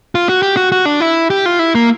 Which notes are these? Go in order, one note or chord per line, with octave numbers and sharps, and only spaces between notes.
F4
F#4
G4
F#4
F#4
D4
E4
G4
F4
E4
A#3